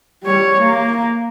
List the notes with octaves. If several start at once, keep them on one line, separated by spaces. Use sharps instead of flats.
G3 C#5
A#3